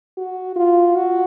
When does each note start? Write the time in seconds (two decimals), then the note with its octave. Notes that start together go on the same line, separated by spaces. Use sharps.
0.17 F#4
0.56 F4
0.95 F#4